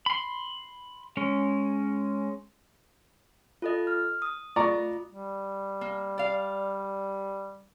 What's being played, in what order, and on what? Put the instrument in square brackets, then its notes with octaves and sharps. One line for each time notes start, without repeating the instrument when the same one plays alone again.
[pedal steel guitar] B5 C6
G#3 C#4
[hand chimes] F4 A4 D#5
F6
D#6
[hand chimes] F4 D#5 [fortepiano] D5 A#5 C#6
[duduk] G3
[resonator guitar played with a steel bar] A#3
D5 F5